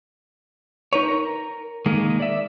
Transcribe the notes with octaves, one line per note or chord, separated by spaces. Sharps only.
D#4 B4 C#5
A#4
D#3 G#3 A#3
D5 E5